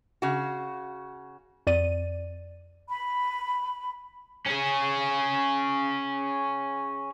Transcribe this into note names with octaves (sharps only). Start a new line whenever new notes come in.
C#3 F#4
F2 D5 D#7
B5
C#4 G#4